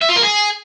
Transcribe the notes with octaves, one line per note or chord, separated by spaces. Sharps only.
E5
F4
A#4
G#4